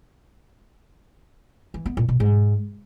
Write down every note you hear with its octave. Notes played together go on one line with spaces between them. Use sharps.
E3
B3
A#2
B2
G#2